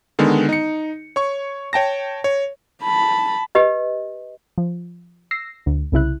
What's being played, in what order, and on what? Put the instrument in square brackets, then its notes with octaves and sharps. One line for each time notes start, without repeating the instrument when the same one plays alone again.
[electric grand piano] D3 D#3 G#3 B3
D#4 C#7
C#5 C#6
C#5 G5 A5 A#6
C#5
[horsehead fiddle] A5 B5
[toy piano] G4 B4 D#5
[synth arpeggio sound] F3
E6 A#6 C7
D2
C2 C#3 E4 F#6